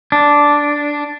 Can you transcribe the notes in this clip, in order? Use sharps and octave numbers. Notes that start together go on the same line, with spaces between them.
D4